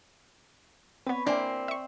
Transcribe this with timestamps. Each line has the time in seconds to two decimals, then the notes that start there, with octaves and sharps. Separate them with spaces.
1.07 B3 C4 B4 C#5
1.27 A#3 C4 D4 E4 D5 G#5
1.68 E5 C#6